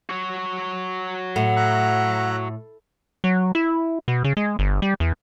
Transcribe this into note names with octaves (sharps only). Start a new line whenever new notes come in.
F#4 C#5
A2 F#5
E5 A#5 F#6
F#3
E4
B2
C#3
G#3
G1
G3
E2